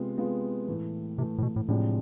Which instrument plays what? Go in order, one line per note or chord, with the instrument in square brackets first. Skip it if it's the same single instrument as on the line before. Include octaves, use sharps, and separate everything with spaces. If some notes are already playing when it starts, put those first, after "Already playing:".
Already playing: [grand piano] C3 G#3 B3 F4
C3 G#3 B3 F4
A2 E3 A3
[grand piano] A2 E3 A3 [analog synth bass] C3
[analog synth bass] A2
B2
A2
[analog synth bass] A2 [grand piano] C3 F3 G#3 D4